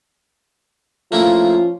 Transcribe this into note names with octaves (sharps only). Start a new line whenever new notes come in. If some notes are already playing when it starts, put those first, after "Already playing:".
F3 A3 A#3 C#4 E4 F4